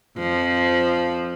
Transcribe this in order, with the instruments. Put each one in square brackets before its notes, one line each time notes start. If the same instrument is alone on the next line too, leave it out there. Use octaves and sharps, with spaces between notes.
[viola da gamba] F2 F3